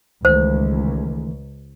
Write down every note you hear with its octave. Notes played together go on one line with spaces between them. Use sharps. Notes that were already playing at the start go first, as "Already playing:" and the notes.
C#2 D#3 E3 A3 C5